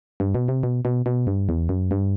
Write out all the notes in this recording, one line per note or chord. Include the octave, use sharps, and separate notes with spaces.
G2
B2
C3
B2
B2
B2
G2
E2
F#2
G2